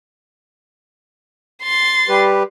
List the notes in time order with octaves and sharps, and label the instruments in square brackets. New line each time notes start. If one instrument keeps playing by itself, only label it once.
[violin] C6 A6
[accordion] G3 G4 B4